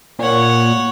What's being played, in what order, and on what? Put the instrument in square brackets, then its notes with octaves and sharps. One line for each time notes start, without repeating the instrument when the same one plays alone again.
[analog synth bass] A#2 [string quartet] C#5 F#5